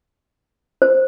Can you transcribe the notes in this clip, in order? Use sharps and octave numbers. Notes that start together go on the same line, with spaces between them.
C5